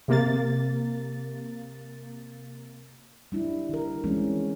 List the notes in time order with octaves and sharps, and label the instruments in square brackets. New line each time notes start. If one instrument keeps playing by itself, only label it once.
[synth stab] C3 A#3 A6
[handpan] G3 D4 E4
D#3 A#4
E3 G#3 C4 C#4